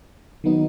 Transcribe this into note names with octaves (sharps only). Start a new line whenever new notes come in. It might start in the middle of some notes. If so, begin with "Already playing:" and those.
D#3 F#3 B3 D#4